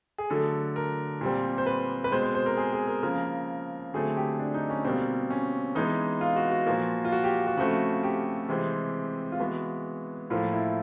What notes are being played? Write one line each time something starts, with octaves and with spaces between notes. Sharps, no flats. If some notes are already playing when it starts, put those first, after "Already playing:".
G#4
D3 F#3 A3 A4
A#4
A#2 G3 C4
C5
B4
B4
B2 G#3 C4 C5
C5
C5
A#4
G#4
G#4
A#4
C#3 F3 A#3 A#4
D3 F#3 A3 C4 G#4
G4
D4
D#4
C#4
B2 G3 A#3 C4
C#4
E3 G#3 B3 D#4
F4
F#4
F#4
A#2 F3 A#3
F4
F#4
G4
F#4
C#3 F3 A3 C4 F#4
G4
C3 E3 G#3 C4
F4
E3 G#3 B3 F#4
A2 F3 A#3 F4
E4